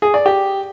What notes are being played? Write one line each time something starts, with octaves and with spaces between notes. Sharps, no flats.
G#4
D5
G4